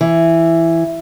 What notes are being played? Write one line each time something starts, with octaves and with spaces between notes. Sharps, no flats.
E3